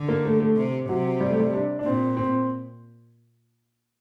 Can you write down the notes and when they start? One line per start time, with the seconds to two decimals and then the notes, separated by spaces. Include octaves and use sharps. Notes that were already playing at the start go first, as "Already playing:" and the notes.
Already playing: D3
0.08 A#3
0.25 A3
0.40 A3
0.57 C3
0.89 C3 F#3
1.20 G3
1.30 A3
1.40 G3
1.54 D4
1.79 D4
1.85 A#2 C4
2.17 C4